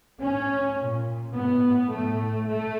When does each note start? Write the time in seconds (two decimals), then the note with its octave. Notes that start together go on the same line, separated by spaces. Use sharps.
0.20 A2 C#4
0.78 A#2
1.34 A2 B3
1.91 A2 A3
2.49 A3